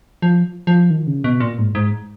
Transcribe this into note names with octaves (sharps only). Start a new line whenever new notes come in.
F3
F3
D#3
C#3
B2
A#2
G#2
G#2